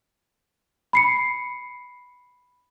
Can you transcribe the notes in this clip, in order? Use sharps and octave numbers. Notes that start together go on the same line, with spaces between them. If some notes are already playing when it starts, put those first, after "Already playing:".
B5 C7 C#7